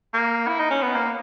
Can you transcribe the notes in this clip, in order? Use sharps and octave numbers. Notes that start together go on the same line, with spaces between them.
A#3
E4
D#4
C#4
B3
A#3